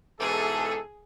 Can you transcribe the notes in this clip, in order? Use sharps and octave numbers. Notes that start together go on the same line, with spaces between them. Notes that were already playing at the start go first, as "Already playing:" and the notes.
G#2 B2 E3 G#4 A4